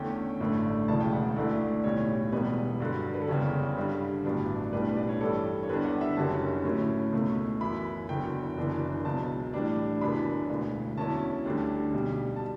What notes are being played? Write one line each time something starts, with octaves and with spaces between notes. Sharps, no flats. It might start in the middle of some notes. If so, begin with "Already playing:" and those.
Already playing: E2 D3 A3 C#4 G5
A1 G2 D3 A3
E1 D2 C#3 E3 A5
G5
F#5
D2 D3 A3 E4 D5
B1 A2 G3 C#5
E1 E2 B2 G3 B4
G2 D3 F#3
B4
A4
F#1 E2 C#3 G3 C#4 G4
G2 D3 G3
A1 G2 F#3 B3 D4
B1 A2 G3 D4 B4
D5
C#5
G2 E3 G3 A4
C#5
E2 D3 G3 D4 B4
F#5
E5
F#1 F#2 D3 G3 C#4 A5
A2 F#3 C#4 E4
C#2 B2 A3
F#2 E3 B3 E4 B5
F#1 E2 D3 F#3 G5
F#1 F#2 E3 B3 D4
C#2 B2 F#3 A5
A2 E3 G3 D4
F#1 F#2 E3 B3 D4 B5
E1 D2 D3
E2 D3 F#3 C#4 E4 A5
D2 D3 G3 D4
B1 B2 G3
A5